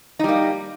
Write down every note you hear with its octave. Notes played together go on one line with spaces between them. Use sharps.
G3 A#3 D#4